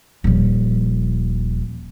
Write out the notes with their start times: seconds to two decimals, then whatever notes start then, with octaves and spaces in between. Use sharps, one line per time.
0.24 D#1 F3